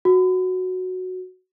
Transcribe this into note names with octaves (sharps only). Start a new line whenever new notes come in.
F#4